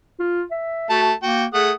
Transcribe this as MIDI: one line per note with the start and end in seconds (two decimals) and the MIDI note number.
0.19 0.42 65
0.51 0.89 76
0.90 1.13 57
0.90 1.11 66
0.90 1.13 81
1.23 1.46 58
1.23 1.44 66
1.23 1.44 79
1.54 1.71 57
1.54 1.71 68
1.54 1.71 78
1.54 1.71 87